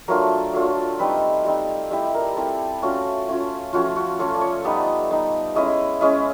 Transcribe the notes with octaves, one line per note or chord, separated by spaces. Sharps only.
F#3 A3 D4 F4 A#4
F#3 A3 D4 F4
G3 C4 D#4 B4
G3 C4 D#4
G3 C4 E4
A#4
G3 C4 E4 A4
A3 C#4 F4 F#4
A3 C#4 F4
F3 A3 C#4 F4 F#4
F#4
F3 A3 C#4 F4 A4
D5
C#5
G3 B3 D#4 D5
G3 B3 D#4
G#3 C#4 E4 D#5
G#3 C#4 E4 D#5